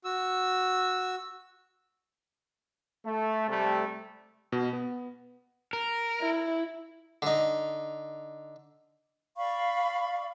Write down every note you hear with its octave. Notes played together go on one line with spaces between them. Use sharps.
F#4 E6
A3
C3 G3 A3
B2
B3
A#4
E4
D3 D#4
D5 F5 B5 C#6